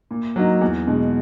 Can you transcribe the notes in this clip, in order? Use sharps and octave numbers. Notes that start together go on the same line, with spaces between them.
A#2
F#3 A#3 D#4
E2
B2 G#3